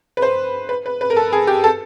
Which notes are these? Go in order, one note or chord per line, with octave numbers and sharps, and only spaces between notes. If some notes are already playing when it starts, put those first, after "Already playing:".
B4
C5
B4
B4
B4
A#4
A4
G#4
G4
A4